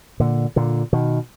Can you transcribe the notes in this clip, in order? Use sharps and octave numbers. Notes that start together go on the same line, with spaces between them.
A#2 D3
A#2 D3
B2 D#3